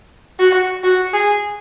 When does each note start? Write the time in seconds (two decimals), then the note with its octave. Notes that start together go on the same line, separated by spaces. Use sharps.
0.39 F#4
0.84 F#4
1.13 G#4